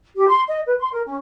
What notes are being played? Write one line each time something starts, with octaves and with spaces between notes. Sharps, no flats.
G4
C6
D#5
B4
C6
A#4
C#4